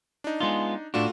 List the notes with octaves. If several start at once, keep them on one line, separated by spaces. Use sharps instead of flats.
D4 D#4
G#3 B3 F4
A2 A3 D4 F4 F#4